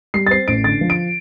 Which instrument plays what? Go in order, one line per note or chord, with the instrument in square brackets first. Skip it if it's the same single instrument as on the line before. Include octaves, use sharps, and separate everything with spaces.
[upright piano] G3 C7
A6
C4 C7
A1 D7
D3 A6
F3
D7